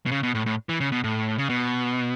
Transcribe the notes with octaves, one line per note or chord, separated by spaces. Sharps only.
B2
C#3
B2
A2
A2
E3
C#3
B2
A2
C#3
B2